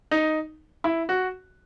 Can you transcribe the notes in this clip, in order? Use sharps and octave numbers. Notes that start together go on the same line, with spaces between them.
D#4
E4
F#4